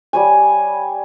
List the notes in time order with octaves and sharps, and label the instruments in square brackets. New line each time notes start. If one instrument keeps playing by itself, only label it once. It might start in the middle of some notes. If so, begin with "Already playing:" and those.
[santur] G3 C#5 G#5